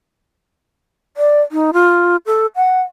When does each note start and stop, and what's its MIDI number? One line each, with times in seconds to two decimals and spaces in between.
1.17 1.41 74
1.52 1.71 63
1.73 2.16 65
2.26 2.46 69
2.56 2.81 78